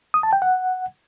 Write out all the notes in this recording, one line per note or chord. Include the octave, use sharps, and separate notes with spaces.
D#6
A5
G5
F#5